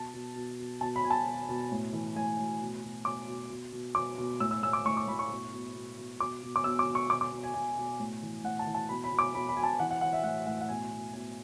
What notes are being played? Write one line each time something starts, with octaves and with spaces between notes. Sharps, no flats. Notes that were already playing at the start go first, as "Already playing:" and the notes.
Already playing: B2 A5
B2
B2
B2
B2 A5
B5
B2 G#5
A5
B2
B2
A2
E3
A2 G#5
A2
B2
B2
B2 D6
B2
B2
B2
B2 D6
B2
A2 E6
E6
A2 E6
D6
A2 C#6
D6
A2 B5
C#6
B2
B2
B2
B2
B2 D6
B2
D6
B2 E6
D6
B2
C#6
B2 D6
D6
B2
G#5
B2 G#5
B2
A2
E3
A2 F#5
A5
E3
A5
B2 B5
B5
B2
D6
B2 B5
B5
B2 G#5
A5
E3 F#5
F#5
E3 F#5
E5
A2 F#5
A2 F#5
F#5
B2 G#5
B2
B2 G#5